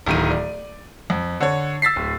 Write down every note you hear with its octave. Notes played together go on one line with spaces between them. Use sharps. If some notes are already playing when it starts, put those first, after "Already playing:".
D1 D#3 D#7
D5
F2
D3 C#5
E6 A6 B6 C7
D1